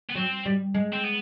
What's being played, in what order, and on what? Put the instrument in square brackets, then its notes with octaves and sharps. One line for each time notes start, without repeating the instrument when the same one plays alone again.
[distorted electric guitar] B3
[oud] F#3 [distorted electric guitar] C4
[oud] G3
G#3
[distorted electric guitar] C4
B3